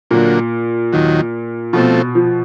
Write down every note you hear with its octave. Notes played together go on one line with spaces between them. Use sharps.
A#2 D3 F#3 A#3
D#2 D#3 F#3
B2 F3 A3 C4
F3